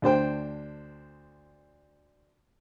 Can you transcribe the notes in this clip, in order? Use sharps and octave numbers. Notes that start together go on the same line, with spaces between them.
D2 D4 C5 G5